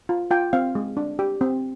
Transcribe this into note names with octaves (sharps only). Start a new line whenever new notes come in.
F4
F4 G5
C4 F5
G#3
D4
G4
C4